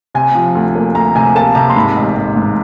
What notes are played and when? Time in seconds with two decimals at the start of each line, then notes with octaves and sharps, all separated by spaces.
0.15 C3 G#5
0.35 F3
0.55 D2
0.75 A#3
0.95 D2 A#5
1.16 C3 G#5
1.35 A#3 A5
1.55 C3 A#5
1.70 C6
1.76 G#2 B5
1.96 A1
2.16 A1
2.36 G#2